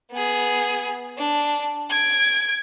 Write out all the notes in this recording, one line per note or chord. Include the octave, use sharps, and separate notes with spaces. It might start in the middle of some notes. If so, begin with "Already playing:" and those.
B3 G#4
D4
G#6 D7